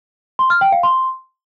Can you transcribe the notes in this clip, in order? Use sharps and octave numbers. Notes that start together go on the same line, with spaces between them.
C6
F6
G5
F5
C6